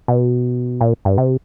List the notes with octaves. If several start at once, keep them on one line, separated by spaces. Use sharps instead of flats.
B2
A#2
G2
C3